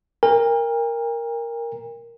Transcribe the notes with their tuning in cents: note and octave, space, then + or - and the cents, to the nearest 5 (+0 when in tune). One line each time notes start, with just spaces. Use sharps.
A#4 +0 G5 +45